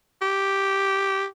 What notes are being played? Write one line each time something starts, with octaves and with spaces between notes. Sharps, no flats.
G4